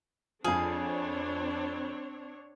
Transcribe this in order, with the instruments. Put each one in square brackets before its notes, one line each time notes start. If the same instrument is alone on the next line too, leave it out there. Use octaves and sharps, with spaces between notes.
[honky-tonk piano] F2 F3 [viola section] C4 D4 C#5 [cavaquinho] G#4 F5 G#5